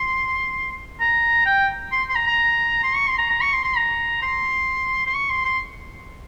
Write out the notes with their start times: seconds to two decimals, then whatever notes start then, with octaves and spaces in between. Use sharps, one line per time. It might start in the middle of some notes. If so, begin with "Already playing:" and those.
Already playing: C6
1.00 A#5
1.46 G5
1.92 C6
2.09 C6
2.15 A#5
2.27 A#5
2.83 C6
2.95 C#6
3.07 C6
3.18 A#5
3.30 A#5
3.41 C#6
3.53 C6
3.64 C6
3.77 A#5
4.22 C6
5.06 C6
5.14 C#6
5.29 C6
5.45 C6